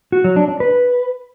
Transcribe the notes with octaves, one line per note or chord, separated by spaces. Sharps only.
F#4
F#3
D4
D4
B4